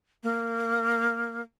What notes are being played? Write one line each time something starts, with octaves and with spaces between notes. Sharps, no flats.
A#3